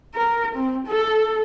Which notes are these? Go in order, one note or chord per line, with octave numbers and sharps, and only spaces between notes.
A#4
C4
A4